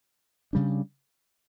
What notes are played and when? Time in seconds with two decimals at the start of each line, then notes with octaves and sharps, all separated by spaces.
0.53 C#3 G3 D4